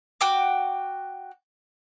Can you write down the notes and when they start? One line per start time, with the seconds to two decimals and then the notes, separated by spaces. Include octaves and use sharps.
0.21 F#4 G5 D6